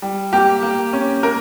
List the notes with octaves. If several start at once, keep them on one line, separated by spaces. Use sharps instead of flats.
G3
A#3 G4
A#3
C#4
A#3 A#4